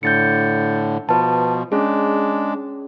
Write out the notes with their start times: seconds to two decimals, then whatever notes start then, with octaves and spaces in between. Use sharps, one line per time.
0.03 A2 D3 G6 A6 C#7
1.09 B2 F3 B4 A5
1.72 G#3 C#4 D4 G#4